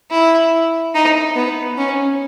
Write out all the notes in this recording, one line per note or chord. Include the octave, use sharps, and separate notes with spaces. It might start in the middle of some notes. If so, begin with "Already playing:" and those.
E4
D#4
B3
C#4